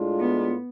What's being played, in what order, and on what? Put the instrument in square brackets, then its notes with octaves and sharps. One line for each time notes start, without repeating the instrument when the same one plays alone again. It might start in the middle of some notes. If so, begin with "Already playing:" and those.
Already playing: [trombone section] A2 G#3 D4 F4
[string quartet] B3